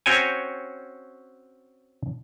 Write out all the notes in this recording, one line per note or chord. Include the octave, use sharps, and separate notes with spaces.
C4 C#4 F#4 C#5 G5 G#5